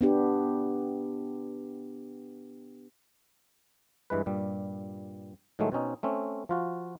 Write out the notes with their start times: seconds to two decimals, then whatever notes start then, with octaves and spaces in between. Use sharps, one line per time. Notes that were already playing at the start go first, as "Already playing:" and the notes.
0.01 B3 D4 G4
4.10 G2 E3 G#3 B4
4.26 G2 A#2 G3
5.59 A2 D#3 F#3 G#3 A3
5.72 B2 C4 C#4 D#4
6.03 A3 C4 C#4
6.49 F3 F4 F#4